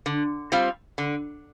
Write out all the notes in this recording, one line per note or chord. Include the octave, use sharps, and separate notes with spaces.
D3
G3 C4 F4
D3